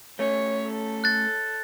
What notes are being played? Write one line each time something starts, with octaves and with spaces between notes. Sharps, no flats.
A3 C#4 C#5
A4
F#6 A6